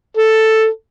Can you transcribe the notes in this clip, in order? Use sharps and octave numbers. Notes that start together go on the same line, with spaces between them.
A4